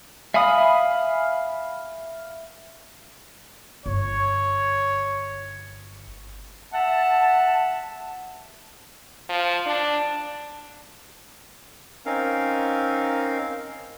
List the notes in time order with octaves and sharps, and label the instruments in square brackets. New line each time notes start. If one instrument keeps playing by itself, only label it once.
[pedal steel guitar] E5 F5 G#5 B5 D#6
[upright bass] G1 [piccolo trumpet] C#5
[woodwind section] E5 F#5 A5
[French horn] F3
D4
[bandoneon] C4 C#4 D#4 A#4 F5